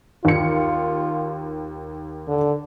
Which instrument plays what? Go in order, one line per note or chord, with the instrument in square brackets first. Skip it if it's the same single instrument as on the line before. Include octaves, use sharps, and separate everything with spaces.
[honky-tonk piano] D#2 C#7 [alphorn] F4
[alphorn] D3